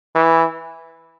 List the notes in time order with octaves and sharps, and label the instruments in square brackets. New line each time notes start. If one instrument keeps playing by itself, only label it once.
[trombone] E3